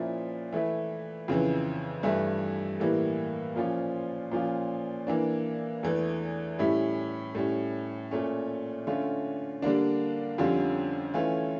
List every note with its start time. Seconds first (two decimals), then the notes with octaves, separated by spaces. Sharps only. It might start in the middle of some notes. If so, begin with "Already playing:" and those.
Already playing: A#2 F3 C#4 E4
0.52 E3 A3 E4
1.28 F2 C#3 E3
2.03 G2 E3 A3 E4
2.80 A2 E3 G3 A#3
3.56 A#2 F3 C#4 F4
4.32 A#2 F3 C#4 F4
5.07 E3 A#3 D4
5.83 E2 E3 A3
6.59 A2 G3 C#4 E4
7.35 A2 G3 C#4
8.11 A#2 A3 C#4
8.87 D3 A3 C#4 F4
9.62 D3 G3 A#3 D4
10.38 F2 D3 G3 C#4 F4
11.14 E3 A3 C#4 F4